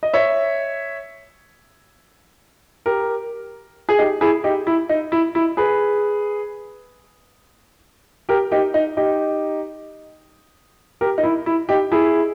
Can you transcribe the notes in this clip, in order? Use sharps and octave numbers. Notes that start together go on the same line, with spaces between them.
D#5
C#5 E5
G4 A#4
G#4
D#4 G4
E4 G#4
D#4 G4
E4
D#4
E4
E4
G#4 B4
G4 A#4
D#4 G4
D#4
D#4 G4
G4 A#4
D#4
E4
E4
D#4 G4
E4 G#4